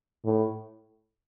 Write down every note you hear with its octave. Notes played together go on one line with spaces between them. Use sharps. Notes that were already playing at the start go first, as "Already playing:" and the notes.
A2